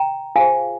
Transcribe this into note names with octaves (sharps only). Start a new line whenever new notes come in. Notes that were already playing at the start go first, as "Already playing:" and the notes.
Already playing: G5 A#5
F4 G#4 C5 F5 G#5